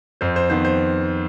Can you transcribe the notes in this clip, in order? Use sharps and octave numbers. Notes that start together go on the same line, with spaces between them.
F2 C5
C5
D#3 B3 C5
C5